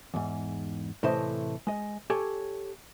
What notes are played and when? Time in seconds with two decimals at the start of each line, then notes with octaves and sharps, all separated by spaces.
0.14 E2 G#2
1.03 A2 C3 E3 A3 C5 D#5
1.67 G#3 D#5
2.10 G4 A4 C#5 G#5